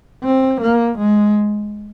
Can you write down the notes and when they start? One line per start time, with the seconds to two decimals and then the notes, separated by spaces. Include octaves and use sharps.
0.24 C4
0.61 A#3
0.98 G#3